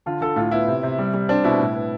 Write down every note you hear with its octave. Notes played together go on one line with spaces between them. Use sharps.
D3 F4
D3 A4
A2 F4
B3 E4
C3
C3
G3
G3
C4 D4
B2 E4
A2
B3